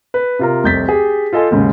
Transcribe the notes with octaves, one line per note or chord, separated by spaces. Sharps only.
B4
C3 F4 A#4
F1 C2 G6 A6 B6
G4 G#4
F4 A4 D#5 G#5 C6
D#2 G#2 C#3